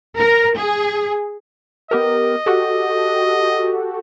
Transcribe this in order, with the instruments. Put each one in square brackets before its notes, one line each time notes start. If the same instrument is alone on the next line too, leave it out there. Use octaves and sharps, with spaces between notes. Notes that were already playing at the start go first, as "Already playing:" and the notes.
[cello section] A#4
G#4
[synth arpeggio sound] B3 G4 A#4 [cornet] D#5
[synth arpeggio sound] F#4 G4 A4